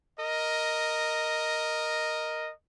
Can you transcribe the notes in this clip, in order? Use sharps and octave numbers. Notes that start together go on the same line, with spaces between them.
A#4 D#5